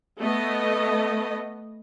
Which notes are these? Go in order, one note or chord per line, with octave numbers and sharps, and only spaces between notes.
A3 B3 D#5